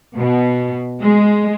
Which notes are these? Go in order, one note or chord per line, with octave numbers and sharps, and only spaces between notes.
B2
G#3